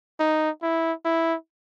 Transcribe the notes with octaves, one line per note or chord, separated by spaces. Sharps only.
D#4
E4
E4